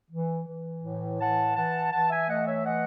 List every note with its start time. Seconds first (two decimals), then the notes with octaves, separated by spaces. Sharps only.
0.11 E3
0.47 E3
0.83 A2
1.19 E3 F#5 A5
1.55 E3 F#5 A5
1.92 E3 F#5 A5
2.10 E5 G#5
2.28 A3 D#5 F#5
2.46 C#5 E5
2.65 E3 D#5 F#5